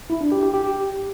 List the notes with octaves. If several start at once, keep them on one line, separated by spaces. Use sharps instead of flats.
E4
D4
G4
G4
G4